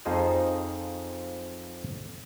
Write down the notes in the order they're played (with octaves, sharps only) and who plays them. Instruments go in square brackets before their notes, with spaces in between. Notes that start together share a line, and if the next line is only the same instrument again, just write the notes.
[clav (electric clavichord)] F2 F3 D#4 G#4 C5 D#5